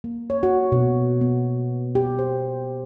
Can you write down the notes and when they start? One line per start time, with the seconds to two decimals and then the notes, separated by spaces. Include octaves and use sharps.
0.04 A#3
0.30 C#5
0.43 F#4
0.72 B2
1.21 B3
1.95 G4
2.19 C5